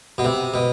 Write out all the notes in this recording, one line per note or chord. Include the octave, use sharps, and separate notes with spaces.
B2
C3
B2